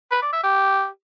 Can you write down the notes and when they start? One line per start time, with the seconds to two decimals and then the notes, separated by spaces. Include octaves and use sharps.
0.12 B4
0.22 D5
0.33 E5
0.43 G4